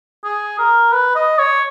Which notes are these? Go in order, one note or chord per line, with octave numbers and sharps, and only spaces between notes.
G#4
A#4
B4
D#5
C#5